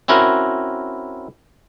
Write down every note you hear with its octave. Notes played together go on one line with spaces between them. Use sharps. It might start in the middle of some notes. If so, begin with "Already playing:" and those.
C4 C#4 E4 F#4 A#4